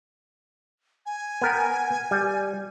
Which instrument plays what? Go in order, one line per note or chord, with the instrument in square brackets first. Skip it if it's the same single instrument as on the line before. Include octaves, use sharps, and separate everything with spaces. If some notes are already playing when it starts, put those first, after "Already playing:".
[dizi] G#5
[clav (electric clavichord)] B3 A#4 G5
G3